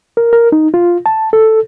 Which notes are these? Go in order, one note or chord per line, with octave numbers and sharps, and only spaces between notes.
A#4
A#4
D#4
F4
A5
A4